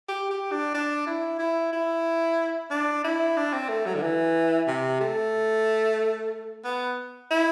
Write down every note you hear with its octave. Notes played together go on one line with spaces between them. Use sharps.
G4
G4
D4
D4
E4
E4
E4
D4
E4
D4
C4
A3
F#3
D3
E3
C3
A3
B3
E4